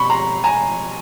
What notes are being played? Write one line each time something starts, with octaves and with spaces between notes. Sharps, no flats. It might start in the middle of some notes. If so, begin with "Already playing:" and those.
Already playing: B2 C4 B5 C#6
A#5 C6
G#5 A#5